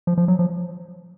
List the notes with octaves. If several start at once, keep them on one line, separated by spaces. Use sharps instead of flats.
F3
F3
F#3
F3